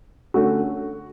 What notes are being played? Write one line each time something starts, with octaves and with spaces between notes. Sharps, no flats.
D3 A3 C#4 F#4